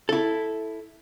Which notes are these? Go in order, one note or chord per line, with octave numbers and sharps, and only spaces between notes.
E4 A4